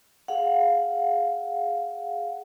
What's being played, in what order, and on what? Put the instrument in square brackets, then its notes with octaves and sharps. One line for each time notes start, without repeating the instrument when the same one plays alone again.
[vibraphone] G#4 F5 F#5